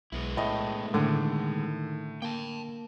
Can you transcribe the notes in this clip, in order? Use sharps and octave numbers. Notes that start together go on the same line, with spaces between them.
B1 G#3 B3 E4
A2 A3 D#5
A2 D3 D#3
A#3 G5 A5